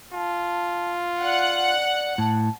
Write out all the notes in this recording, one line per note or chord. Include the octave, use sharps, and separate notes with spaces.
F4 A5
D5 F#5
A2 A5